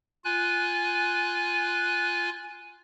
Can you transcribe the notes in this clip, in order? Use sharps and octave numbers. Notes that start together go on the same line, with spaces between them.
F4 G#5 F#6